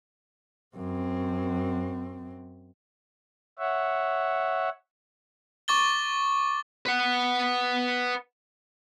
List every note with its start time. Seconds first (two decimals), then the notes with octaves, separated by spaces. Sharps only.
0.76 F#2 C4
3.59 C#5 E5 F#5
5.68 C#6 D6 A6 G7
6.86 B4 F#5